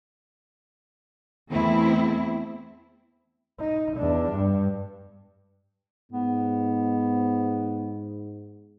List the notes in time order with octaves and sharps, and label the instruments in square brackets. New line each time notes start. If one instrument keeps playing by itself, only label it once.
[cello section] E2 A3 C4 E4
[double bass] D#4
E2 D4
G2
[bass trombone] G#2 [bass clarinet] B3